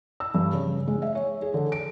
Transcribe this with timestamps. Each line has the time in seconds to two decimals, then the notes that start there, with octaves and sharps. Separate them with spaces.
0.20 E6
0.34 G2
0.53 C#3
0.88 G#3
1.02 E5
1.15 C#5
1.42 G#4
1.54 D3
1.72 D7